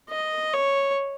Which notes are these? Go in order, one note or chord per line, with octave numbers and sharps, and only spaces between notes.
D#5
C#5